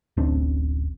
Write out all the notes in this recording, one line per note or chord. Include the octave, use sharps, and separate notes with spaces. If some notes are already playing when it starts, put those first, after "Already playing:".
D1 A1 C4 D4